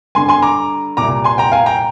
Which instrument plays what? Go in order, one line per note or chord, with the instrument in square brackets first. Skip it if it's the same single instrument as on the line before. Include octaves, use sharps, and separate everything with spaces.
[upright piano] G2 D3 G#5 C6
G#5 C6
A#5 D6
C2 A#2 A#5 D6
G#5 C6
G5 A#5
F5 G#5
G5 A#5